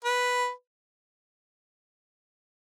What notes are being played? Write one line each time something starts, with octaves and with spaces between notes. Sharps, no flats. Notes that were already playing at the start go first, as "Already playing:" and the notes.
B4